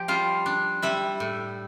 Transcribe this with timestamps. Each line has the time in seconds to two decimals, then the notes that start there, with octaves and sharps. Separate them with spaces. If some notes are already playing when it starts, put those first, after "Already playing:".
Already playing: F3 G4 G5
0.08 G3 F4 F5
0.46 D4
0.82 G3 E4 E5
1.20 A2